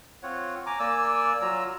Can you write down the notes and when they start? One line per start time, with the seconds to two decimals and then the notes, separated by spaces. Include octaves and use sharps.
0.23 C4 F4 C#5 F#5
0.66 G#5 A#5 D6
0.79 A#3 D5 G#5 E6
1.42 F#3 F4 A#5 E6